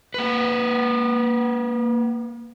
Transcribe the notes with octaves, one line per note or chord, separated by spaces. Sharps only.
A#3 B4